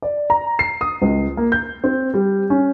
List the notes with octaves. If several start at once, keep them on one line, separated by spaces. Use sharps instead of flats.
D5
A#5
C7
D#6
C#2
A#3
G6
C4
G3
C#4